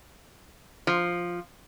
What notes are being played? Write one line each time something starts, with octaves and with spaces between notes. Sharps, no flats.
F3